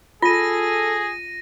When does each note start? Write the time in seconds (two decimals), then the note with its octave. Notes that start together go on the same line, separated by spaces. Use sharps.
0.22 F4 G#4 A4 A#6 D#7